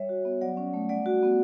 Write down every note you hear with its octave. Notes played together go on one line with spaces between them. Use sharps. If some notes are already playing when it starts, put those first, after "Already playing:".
Already playing: G3 C#5 E5
F#4
B3
F#3 D5 F#5
C#4
A3
G3 D5 F#5
F#4
B3